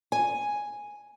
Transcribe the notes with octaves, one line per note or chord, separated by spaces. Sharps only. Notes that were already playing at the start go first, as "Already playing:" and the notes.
G#5